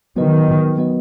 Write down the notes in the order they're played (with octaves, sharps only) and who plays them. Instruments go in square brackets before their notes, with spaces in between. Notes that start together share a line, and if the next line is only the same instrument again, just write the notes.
[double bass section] D#3 [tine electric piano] F#3 B3 F#4 B4 D#5
[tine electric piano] F#3 B3 F#4 B4 D#5